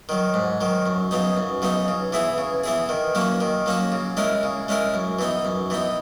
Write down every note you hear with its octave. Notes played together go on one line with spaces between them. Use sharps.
D#3 F#3
G#2
D#3 F#3
F#2
C#3 F#3 B3 D#4
F#2
C#3 F#3 B3 D#4
C#3
E3 B3 E4 G#4
C#3
E3 B3 E4 G#4
D#3
F#3 A#3 C#4 F#4
D#3
F#3 A#3 C#4 F#4
C#3
G#3 C#4 E4 A#4
C#3
G#3 C#4 E4 A#4
F#2
E3 B3 D#4
F#2
E3 B3 D#4